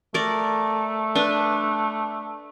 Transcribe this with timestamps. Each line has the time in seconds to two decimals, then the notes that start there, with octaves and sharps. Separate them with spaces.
0.14 A3 A#4 D5
1.15 D4 B4